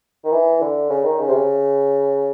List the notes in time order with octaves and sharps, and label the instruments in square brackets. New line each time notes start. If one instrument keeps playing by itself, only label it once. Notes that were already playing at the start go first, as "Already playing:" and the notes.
[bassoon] D#3
E3
D3
C#3
D#3
C#3
C3
C#3